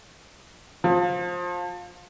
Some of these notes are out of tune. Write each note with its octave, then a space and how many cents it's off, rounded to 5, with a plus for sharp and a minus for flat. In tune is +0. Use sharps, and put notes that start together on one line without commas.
F3 +25